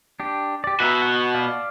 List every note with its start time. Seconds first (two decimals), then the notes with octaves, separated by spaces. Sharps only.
0.20 D4 G4
0.64 G4 D5
0.80 B2 F#4 B4 E5 A#5
1.02 F#5 C#6
1.35 D5 F5